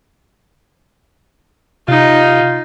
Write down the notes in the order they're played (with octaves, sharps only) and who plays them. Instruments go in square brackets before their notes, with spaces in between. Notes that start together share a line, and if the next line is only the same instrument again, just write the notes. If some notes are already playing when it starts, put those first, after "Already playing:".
[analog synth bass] C3 [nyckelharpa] D#4 [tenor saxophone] F4